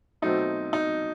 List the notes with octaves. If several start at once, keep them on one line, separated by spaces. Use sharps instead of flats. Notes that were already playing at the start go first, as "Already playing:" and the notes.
B2 F#3 A3 C4 D#4
D#4